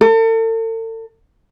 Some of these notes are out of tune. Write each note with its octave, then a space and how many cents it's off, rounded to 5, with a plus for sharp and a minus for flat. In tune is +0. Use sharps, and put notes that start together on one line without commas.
A4 +40